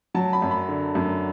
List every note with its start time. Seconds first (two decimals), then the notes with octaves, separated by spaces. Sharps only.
0.14 F#3 A5
0.33 B5
0.42 F#2
0.51 B5
0.68 D3
0.95 F#2